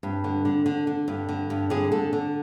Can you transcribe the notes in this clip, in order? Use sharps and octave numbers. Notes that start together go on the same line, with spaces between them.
G2
D3
D3
D3
D3
G2
D3
G2
D3 G#4
D3 A4
D3